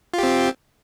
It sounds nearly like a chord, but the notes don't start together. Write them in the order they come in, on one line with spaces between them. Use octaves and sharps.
F4 G4 C4